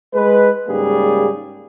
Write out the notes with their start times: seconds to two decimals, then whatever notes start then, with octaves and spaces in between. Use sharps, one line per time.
0.14 G#3 B4
0.68 G#2 C#3 G3 A#3 G#4